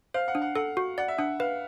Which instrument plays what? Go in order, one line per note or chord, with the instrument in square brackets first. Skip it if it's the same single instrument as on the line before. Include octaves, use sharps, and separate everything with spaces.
[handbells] C5 [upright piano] F5
[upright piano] F#5
[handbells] D4
[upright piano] F#5
[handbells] A4 [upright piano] F#5
[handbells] F#4
[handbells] D5 [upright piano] F#5
[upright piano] E5
[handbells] D4 [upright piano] F#5
[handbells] B4 [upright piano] F5